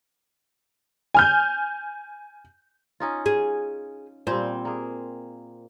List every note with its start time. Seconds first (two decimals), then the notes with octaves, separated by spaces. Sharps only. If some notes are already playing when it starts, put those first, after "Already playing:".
1.14 G#5 F6 G6
3.00 C#4 D#4 F4
3.26 G#4
4.27 A#2 G3 C4
4.65 A#3 G#4